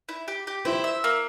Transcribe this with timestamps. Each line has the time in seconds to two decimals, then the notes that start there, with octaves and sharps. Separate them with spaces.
0.09 E4
0.28 G4
0.47 G4
0.65 E4 C5
0.84 E5
1.04 A#3